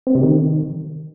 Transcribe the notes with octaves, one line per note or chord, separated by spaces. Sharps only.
C4
C3
D#3